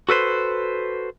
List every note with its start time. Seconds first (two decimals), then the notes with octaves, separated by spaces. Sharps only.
0.09 F#4 A4 B4 C5